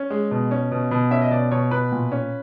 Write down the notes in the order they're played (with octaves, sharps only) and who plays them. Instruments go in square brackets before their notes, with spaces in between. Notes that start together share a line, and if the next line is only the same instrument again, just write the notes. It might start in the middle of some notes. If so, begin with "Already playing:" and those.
Already playing: [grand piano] C#4
G#3
B2
C#4
B2
B2
C#4 E5
D#5
B2 D5
B2 C#5
B2 B4
A#2
C#4